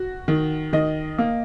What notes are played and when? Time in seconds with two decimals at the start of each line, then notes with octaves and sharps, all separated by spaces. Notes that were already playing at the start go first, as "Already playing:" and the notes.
Already playing: F#4
0.28 D#3
0.73 D#3 D#5
1.18 A#3